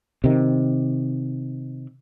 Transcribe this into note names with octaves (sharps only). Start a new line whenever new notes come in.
C3 D#3